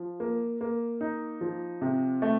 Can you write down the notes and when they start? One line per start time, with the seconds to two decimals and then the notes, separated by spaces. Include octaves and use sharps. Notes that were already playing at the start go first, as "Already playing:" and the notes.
Already playing: F3
0.20 A#3
0.61 A#3
1.01 D#4
1.41 F3
1.82 C3
2.22 A3